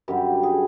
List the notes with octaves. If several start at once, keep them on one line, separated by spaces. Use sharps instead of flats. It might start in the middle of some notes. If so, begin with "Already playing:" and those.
F#2 D3 G3 G4
G#4